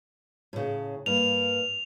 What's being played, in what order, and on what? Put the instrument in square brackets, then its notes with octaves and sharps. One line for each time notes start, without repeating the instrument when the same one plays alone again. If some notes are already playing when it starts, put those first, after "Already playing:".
[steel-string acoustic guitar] A2 C#3
[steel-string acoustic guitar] G2 A#3 [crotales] F7